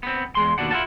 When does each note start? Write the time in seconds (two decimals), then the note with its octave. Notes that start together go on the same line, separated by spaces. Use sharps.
0.03 B3 C4
0.35 E2 G#3 C6
0.58 D#2 B2 D4 F#5
0.71 E4 F4 F#5 A5